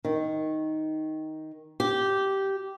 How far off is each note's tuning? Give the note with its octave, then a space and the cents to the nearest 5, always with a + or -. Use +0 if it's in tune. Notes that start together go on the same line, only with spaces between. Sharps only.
D#3 +5
G4 -10